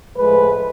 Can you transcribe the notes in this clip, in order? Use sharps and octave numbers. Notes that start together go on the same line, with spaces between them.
A2 F3 G#3 B4